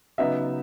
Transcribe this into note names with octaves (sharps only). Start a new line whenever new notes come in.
C#3 F#3 B3 D#4 E5